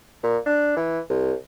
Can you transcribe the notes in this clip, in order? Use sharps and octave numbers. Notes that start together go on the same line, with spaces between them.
A#2
D4
E3
C2